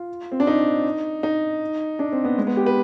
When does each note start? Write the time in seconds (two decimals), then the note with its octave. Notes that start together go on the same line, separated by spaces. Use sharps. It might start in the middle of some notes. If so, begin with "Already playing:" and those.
Already playing: F4
0.32 C4
0.40 D4
0.47 D#4
1.23 D#4
1.99 D4
2.12 C4
2.25 B3
2.38 G#3
2.47 B3
2.57 G4
2.66 B4